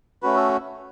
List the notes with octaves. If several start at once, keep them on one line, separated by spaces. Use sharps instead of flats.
A3 C#4 F#4 B4
A4